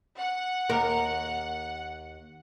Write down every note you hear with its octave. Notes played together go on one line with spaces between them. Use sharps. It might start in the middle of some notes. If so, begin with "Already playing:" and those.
F#5
D#2 A#4